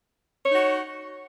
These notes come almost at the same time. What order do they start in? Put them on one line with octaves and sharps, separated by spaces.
C#5 D#4 F#4